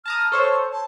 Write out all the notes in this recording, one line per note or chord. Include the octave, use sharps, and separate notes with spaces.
A5 A#5 D#6 F6
A4 C5 C#5 C#6
A5